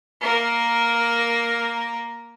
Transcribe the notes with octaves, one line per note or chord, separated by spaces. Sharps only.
A#3 A#4